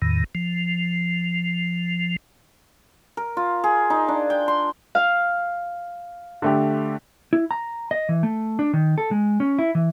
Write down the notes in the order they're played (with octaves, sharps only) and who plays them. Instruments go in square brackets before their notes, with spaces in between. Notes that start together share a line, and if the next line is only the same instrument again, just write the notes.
[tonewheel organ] E2 A2 D#3
F3
[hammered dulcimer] A#4
F4
G#4
D#4
D4
G5
C6
[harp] F5
[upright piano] D3 A3 G4
[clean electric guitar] E4
A#5
D#5
E3
A3
D4
D#3
A4
G#3
C#4
E4
E3